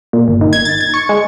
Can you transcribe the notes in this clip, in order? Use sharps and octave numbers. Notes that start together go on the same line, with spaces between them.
A#2
G1
D#3
G#6
A6
G#6
C#6
G#3